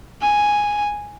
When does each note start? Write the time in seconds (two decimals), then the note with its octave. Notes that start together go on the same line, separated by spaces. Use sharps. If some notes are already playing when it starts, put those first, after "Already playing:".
0.22 G#5